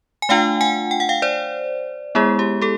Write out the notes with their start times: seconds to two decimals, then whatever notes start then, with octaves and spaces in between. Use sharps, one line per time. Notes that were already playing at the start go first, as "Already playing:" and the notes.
0.22 G#5
0.29 A3 D4 F4 F5 G5
0.61 F#5 G#5
0.91 G5
1.00 F#5
1.09 F5 G5
1.22 C5 D5
2.15 G#3 B3 E4 G#4
2.39 G4
2.62 G4 A4